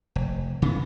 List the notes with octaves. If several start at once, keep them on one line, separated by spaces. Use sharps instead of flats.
F1
C#3 B3